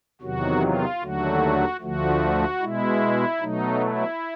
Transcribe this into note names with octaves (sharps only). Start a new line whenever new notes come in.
E2 C3 D#3 F#3 F#4
F4
D#2 D3 F#3 A3 F#4
D2 D3 F3 A3 F#4
B2 G#3 E4
B2 F#3 A3 D#4
E4